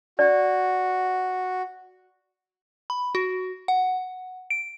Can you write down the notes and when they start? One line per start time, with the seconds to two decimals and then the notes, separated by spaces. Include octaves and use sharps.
0.19 F#4 D5
2.90 B5
3.15 F#4
3.68 F#5
4.50 D7